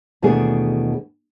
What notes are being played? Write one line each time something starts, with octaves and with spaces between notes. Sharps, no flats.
D#2 B2 E3 A3 D4 G#4